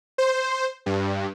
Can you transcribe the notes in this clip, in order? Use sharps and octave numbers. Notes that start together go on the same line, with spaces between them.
C5
G2